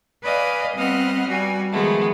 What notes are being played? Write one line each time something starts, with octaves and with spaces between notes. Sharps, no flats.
B4 D5 D#5 F5 G#5
G3 B3 C4 D#5 F#5 F6
G3 F#4 G#5
D#3 F3 G#3 A3 B3